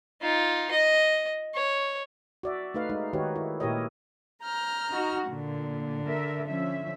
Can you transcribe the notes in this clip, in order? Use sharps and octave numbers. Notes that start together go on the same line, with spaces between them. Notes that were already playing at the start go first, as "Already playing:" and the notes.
D#4 F4
D#5
C#5
F#4 D5 E5
A3 D#4 B4 F5
G#3 D#4
D#3 D#4 F#4 G4 B4 C#5
E4
A#2 E4 G4 A#4 C#5 D#5
A#5 F6 G6
D#4 F#4
A#2 D3
A#4 E5
F3 C#4 E5